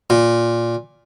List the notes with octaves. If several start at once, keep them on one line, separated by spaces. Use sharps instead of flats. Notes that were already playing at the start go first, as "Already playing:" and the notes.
A#2